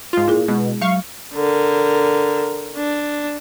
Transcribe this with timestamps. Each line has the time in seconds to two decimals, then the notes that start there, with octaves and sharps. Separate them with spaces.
0.13 G#2 F4
0.28 A#2 E4 G#4
0.48 B2 G#3
0.82 F#3 F5 C#6
1.35 D3 A#4
2.76 D4